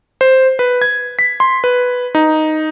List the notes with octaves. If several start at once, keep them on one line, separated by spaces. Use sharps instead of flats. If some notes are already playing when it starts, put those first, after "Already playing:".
C5
B4
G#6
B6
C6
B4
D#4